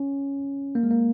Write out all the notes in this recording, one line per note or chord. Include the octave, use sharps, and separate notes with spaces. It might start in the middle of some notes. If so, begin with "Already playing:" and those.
Already playing: C#4
A#3
G#3
A#3